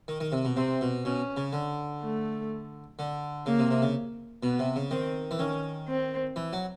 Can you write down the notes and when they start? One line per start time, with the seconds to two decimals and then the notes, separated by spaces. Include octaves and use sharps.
0.08 D#3
0.20 D#3
0.32 C3
0.45 B2
0.57 C3 C4
0.81 B2
1.04 B2 C#4
1.37 C#3
1.53 D3
2.01 A3
2.99 D3
3.46 C#3 A#3
3.59 C3
3.71 C3
3.82 C#3
4.43 B2 B3
4.59 C3
4.76 C#3
4.91 D#3 C4
5.31 E3
5.39 D#3 C#4
5.88 C4
6.36 E3
6.53 F#3